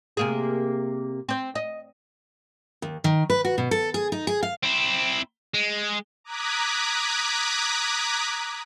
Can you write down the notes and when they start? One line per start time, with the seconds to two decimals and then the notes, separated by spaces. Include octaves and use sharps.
0.17 C3 A#3 G#4
1.29 C4 C5
1.55 D#5
2.82 D#2
3.04 D#3
3.30 B4
3.45 F#4
3.58 B2
3.71 A4
3.94 G#4
4.12 D#4
4.27 G#4
4.43 F5
4.63 C4 E4
5.54 G#3
6.24 A#5 D6 D#6 F#6 G#6 B6